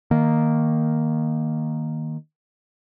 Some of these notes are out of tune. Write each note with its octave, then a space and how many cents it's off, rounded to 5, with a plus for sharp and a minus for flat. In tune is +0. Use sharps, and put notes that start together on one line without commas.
D#3 +0 A#3 +0